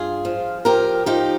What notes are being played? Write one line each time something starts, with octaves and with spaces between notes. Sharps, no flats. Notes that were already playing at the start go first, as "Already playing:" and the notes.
Already playing: G2 F4 G#4
F3
F3 G4 A#4
F3 D#4 G4